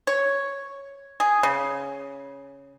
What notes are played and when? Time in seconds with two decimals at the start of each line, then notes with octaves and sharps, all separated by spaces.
0.07 C#5
1.20 G#4
1.43 C#3